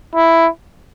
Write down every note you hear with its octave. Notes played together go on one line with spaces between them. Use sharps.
E4